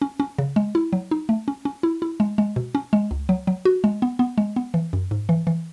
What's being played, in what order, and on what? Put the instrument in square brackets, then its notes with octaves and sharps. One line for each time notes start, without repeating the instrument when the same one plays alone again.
[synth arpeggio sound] C#4
C#4
C#3
G#3
E4
F#3
D#4
A3
C#4
C#4
E4
E4
G#3
G#3
B2
C#4
G#3
C#2
F#3
F#3
F#4
G#3
B3
B3
G#3
B3
E3
F#2
G#2
E3
E3